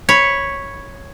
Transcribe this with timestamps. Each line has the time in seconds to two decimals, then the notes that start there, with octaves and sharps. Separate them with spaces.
0.09 C#5 B5